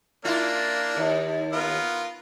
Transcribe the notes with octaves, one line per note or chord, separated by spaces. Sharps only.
A#3 D4 E4 F4
D#2
B3 F4 A#4